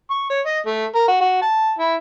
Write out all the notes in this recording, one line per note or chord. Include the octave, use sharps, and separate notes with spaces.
C#6
C#5
D#5
A3
A#4
F#4
F#4
A5
E4